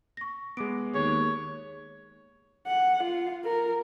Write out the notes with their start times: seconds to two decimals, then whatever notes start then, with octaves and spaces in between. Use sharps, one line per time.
0.17 C#6 A#6
0.57 G#3 B3 G#4 D6 D7
0.94 D#2 G#4 C#5
2.67 F#5
3.04 F4
3.45 A#4